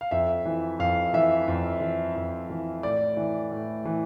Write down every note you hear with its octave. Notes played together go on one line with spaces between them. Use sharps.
F5
F2 E5
E3
F2 F5
E3 E5
F2
E3
F2
E3
A2 D5
E3
A2
E3